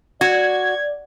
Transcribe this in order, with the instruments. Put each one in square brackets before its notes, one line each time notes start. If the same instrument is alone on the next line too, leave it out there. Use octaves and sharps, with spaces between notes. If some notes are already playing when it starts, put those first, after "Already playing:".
[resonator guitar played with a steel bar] F#4 [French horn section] D5 [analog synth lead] G#6